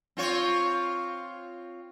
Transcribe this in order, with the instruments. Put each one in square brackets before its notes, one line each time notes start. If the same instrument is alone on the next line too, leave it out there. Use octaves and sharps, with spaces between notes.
[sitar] C4 F4 C#5